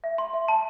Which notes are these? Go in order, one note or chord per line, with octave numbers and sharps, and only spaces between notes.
E5
C6
E5
A5